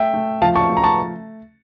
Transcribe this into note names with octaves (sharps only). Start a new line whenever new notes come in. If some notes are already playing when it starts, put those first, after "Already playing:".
Already playing: A3 E5 G5
A3
F3 F5 A5
A5 C#6
A3
A#5
A5 C#6